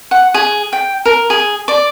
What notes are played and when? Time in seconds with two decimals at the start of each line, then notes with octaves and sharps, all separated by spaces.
0.11 F#5
0.34 G#4
0.73 G5
1.06 A#4
1.30 G#4
1.68 D5